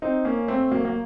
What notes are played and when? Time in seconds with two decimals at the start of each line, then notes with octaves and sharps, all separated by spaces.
0.02 C4 D#4
0.25 A#3 C#4
0.48 A3 C4
0.71 F#3 A#3
0.85 A#3